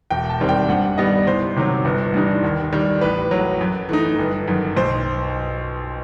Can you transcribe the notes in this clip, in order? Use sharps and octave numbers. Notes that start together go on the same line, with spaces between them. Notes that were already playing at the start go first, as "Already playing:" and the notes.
E1 G5
A5
D#2 D#3 G3 C4
G5
G2 F#5
D#3 G3 B3 D#5
C2 C5
C3 D#3 F#3
G1
G2 E3 G3 D#4
D#2
D#3 G3
A1 B4
A2 F#3
F#2
E3 A3 D#4
G1
F#2 D#3
B1 C5